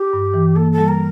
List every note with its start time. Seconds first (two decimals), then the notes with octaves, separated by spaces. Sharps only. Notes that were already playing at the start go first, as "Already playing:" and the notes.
Already playing: G4
0.13 G2
0.34 E3
0.56 A#3 A4
0.72 A4
0.78 G3
0.88 A#4